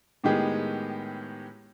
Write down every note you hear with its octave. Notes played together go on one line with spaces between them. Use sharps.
A2 D#3 G#3 B3 G4 G#4